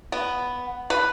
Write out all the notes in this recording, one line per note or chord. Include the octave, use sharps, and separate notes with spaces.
B3
B4